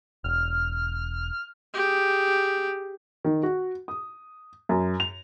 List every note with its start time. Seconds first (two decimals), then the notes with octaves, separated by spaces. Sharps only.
0.24 E1 F6
1.74 G4 G#4
3.25 D#3
3.43 F#4
3.88 D#6
4.69 F#2
5.00 F7